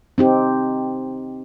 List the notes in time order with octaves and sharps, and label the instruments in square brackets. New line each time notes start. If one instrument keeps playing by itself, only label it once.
[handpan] C4 D#4 G4